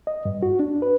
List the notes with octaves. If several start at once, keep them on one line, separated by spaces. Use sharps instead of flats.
D#5
G2
F#4
D4
B4